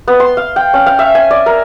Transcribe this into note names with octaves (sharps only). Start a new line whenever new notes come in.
B3
C6
F5
G5
C#4
F5
E5
G#5
D5
A#4